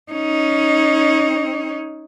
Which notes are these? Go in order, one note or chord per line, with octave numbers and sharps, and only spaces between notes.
C#4 D#4